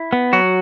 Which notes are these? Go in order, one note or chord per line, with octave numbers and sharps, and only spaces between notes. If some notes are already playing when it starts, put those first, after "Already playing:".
Already playing: E4
B3
F#3 F#4